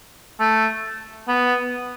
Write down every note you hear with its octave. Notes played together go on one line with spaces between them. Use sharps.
A3
B3